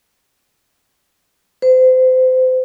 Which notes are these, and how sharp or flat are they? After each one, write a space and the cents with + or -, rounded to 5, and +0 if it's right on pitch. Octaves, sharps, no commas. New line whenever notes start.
C5 -30